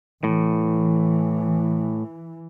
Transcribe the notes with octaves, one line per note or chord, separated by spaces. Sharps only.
A2 E3